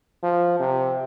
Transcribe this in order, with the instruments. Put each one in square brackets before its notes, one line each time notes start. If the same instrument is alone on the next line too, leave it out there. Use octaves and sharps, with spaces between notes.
[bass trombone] F3
C3